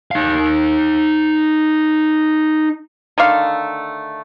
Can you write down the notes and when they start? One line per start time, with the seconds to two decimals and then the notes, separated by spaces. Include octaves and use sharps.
0.11 D#4 F5
3.18 D3 D#3 A3 F5